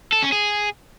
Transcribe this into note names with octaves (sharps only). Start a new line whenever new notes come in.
A4
C#4
G#4